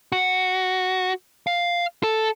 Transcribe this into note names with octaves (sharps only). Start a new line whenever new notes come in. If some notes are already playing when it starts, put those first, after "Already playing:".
F#4
F5
A4